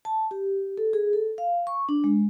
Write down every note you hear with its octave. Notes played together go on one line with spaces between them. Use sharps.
A5
G4
A4
G#4
A4
F5
C#6
D4
G#3